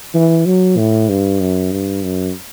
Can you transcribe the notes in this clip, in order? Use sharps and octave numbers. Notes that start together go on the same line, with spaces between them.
E3
F#3
A2
G2
F#2
G2
F#2